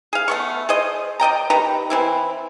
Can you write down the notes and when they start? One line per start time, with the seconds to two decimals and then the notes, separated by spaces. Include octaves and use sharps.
0.13 G#4 F5
0.28 A3 B3 C#6
0.69 G#4 C5 D#5
1.20 D5 D#5 G5 A#5
1.50 D#3 G4 B4 A#5
1.90 E3 C4 E4